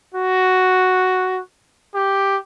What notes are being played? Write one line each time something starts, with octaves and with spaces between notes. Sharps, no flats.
F#4
G4